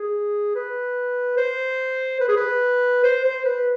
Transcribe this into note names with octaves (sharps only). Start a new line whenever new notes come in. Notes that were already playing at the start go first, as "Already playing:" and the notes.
Already playing: G#4
B4
C5
B4
G#4
B4
C5
C5
B4